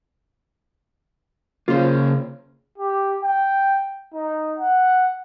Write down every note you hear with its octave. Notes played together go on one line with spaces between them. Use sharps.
C#3 A#3 C#4 F4 C5
G4
G5
D#4
F#5